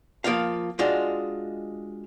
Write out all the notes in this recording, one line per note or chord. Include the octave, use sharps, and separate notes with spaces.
F3 A#3 F4 F5
G#3 D4 F4 F#4